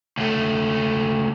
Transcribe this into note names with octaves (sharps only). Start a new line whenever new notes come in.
C#2 A3